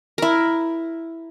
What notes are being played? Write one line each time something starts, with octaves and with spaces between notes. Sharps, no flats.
E4 A#4